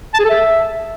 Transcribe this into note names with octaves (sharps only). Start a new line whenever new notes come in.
A5
G#4
A4
E5